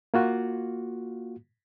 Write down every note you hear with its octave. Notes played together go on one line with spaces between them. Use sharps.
A#3 F4 F#4